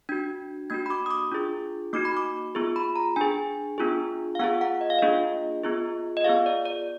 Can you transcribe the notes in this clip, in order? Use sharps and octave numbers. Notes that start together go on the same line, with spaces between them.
D4 F#4 G#6
A#3 D4 F#4 G#6
B5
D6
D#6
D6
D4 F4 G#4
A#3 D#4 F#4 D6
B5
D6
B3 F4 G#4
B5
A#5
D4 G#4 G#5
B3 D4 F4 G#4
F5
B3 F4 G#4 F#5
F#5
D#5
F5
A#3 D4 F4 G#4 D#5
B3 F4 G#4
D#5
B3 F4 G#4 F5
D5
D5